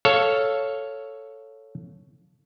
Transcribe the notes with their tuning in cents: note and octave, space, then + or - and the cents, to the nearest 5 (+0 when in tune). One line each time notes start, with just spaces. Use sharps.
A4 +0 C#5 +0 F5 +0